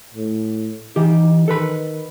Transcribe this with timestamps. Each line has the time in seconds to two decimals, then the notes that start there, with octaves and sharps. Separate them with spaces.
0.14 A2
0.96 E3 D#4 G4
1.48 D#3 A4 B4 B5